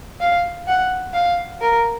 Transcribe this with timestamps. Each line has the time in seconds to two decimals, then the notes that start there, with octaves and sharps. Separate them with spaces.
0.21 F5
0.68 F#5
1.14 F5
1.61 A#4